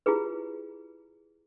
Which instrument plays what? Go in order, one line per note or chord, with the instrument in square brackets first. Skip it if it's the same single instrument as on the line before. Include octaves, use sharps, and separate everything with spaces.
[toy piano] E4 F4 G4 G#4 B4